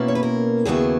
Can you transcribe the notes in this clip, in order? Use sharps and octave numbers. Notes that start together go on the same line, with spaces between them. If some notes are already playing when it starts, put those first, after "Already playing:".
Already playing: B2 A#3 C#4 E4
C#5
B4
A#4
D#2 C#3 F#3 B3 E4 G#4